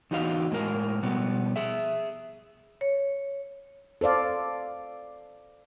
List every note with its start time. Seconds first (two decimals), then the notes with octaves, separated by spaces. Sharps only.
0.11 E2 D#4 F#4 D#5 F5
0.52 A2 G#3 A#4
1.03 B2 G3 B3
1.56 G#4 E5
2.81 C#5
4.01 A4 C5 D5 F5